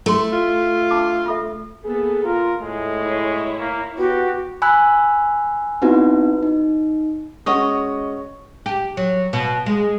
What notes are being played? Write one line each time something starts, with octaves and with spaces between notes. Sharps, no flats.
A3 E4 G4 C6
F4
D4 A5 D6
F4 A4 E5
A#3 B3 G#4 A4
F4 A#4
A2 G#3 A3
E4 C#5
A#3
B3 F#4 G4
G#5 B5 E6 F#6
B3 C4 D#4 E4 F#4 B4
D#4
G#3 C#4 F#4 C#5 D#5 C#6
G4
F#3
B2
G#3